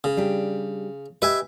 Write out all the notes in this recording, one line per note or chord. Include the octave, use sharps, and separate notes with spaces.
C#3
G3 D4 G4
G4 B4 D#5 E5 G#5